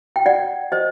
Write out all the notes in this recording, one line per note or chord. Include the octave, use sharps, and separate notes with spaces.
G5
D5 F#5
C5 D#5